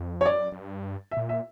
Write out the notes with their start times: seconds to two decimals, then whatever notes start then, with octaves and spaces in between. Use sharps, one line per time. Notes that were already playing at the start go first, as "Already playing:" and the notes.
Already playing: F2
0.21 C#5
0.26 F#2 D5
0.52 F#2
0.60 G2
1.11 E5
1.17 A#2
1.29 E5